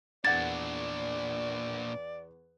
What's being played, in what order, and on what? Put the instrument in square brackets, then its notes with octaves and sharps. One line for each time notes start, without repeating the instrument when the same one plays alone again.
[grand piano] E2 F#5 G#6 [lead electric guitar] A#2 D4 [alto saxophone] D5 [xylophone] A6